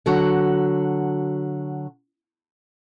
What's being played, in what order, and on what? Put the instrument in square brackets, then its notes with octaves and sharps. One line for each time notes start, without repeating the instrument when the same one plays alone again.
[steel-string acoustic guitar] D3 F#3 F#4